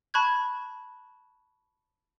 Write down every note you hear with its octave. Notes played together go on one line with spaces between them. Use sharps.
A5 B5 C#6 F#6 G#6